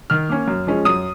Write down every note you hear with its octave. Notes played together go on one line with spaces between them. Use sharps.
D#3 F6
A#3 C#4
F#2
F3 G#3 C#4
F#2 D#6